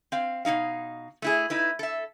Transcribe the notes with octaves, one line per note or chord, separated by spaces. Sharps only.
C4 F5
B2 D#3 D#4 F5
A3 E4 G#4
D#4 E4 B4
A4 E5